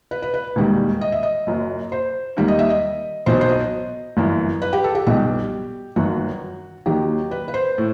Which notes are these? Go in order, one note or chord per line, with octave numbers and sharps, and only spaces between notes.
B4
B4
B4
E1 D#2 D#3 G3
D#5
E5
D#5
F#1 F#2 F#3
C5
D#2 D#3 G3
D#5
E5
D#5
B1 B2 F#3 C5
C5
D#5
G1 F#2 E3
B4
G4
A4
G4
B1 B2 G3 G4
G1 F#2 D#3 F#3 F#4
D#2 D#3 F#3 G4
B4
B4
C5
A2